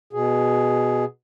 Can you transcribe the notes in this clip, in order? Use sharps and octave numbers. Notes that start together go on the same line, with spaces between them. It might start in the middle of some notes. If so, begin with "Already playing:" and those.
B2 G#4